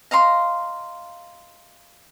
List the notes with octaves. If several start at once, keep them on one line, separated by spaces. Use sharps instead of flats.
D#5 F5 A#5 C6